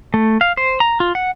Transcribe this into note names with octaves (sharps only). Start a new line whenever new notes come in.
A3
F5
C5
A#5
F4
F#5